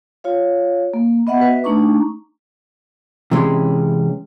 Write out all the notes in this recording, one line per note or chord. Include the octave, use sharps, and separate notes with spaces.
F4 C#5 F5
A#3
B3 D#5 E5 F#5
F#4 B4 E5
A3 D4 D#4 A#5 C#6 D6
C3 E3 G#3 C#4 C6